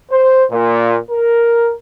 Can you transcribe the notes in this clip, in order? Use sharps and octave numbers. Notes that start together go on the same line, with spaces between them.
C5
A#2
A#4